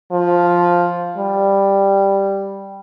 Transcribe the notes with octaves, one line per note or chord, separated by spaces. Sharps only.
F3
G3